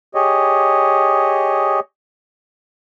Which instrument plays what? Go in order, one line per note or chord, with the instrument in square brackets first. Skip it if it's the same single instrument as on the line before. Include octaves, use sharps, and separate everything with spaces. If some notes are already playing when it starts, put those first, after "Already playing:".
[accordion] G4 G#4 C#5 D#5